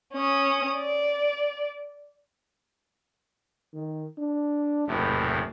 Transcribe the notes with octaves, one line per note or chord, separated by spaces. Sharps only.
C#4 D#6
D5
D#3
D4
F#1 E2 A2 C3